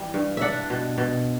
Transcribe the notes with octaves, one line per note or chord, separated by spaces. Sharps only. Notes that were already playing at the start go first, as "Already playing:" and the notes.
Already playing: E3 G3
G2
D4 E5 F#5
B2
B2